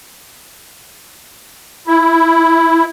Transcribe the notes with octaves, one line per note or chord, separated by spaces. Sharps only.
E4